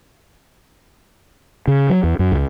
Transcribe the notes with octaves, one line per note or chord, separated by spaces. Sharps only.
C#3
F#3
E2
F#2
C#2